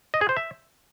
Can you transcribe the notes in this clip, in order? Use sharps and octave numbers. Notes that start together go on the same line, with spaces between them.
D#5
G#4
C5
E5